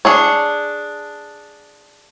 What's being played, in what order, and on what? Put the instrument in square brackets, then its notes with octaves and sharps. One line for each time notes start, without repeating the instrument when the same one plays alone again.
[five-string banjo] D4 G#4 C#5